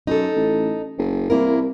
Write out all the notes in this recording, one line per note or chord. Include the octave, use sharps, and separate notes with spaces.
F#2 D#4 A4
A1
F#1
C2 A#3 E4 A#4